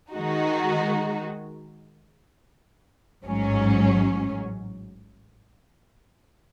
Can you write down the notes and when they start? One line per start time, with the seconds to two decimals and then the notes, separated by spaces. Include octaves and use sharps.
0.12 D#3 G#3 D#4 F#4
3.24 A1 G#2 F#3 C#4